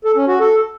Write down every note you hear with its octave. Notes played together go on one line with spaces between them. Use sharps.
A4
C#4
F#4
A4